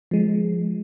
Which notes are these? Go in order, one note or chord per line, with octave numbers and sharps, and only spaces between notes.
F3 G#3